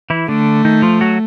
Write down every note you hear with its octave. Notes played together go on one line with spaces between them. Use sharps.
E3 E4
D3 A3 D4
D#3 D#4
F3 F4
F#3 F#4